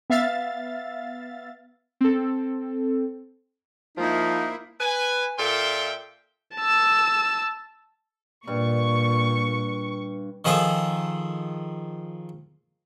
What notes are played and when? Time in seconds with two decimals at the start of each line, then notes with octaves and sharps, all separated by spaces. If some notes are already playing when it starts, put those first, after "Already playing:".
0.10 B3 E5 F5 A6
2.01 C4 A4
3.98 F3 A#3 D#4 E4
4.81 B4 G#5
5.39 A#2 A4 E5 F5 G5 C6
6.56 A5 E6
8.47 G2 A#2 C#6
10.45 D#3 F3 G#4 A4